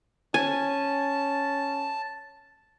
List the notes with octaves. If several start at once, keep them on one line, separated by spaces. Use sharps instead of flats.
C#4 G#5 A5